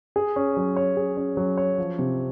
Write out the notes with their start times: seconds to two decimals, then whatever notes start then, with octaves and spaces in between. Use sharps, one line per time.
0.16 G#4
0.36 C#4
0.57 F#3
0.76 C#5
0.97 G#4
1.17 C#4
1.37 F#3
1.58 C#5
1.78 F3
1.99 C3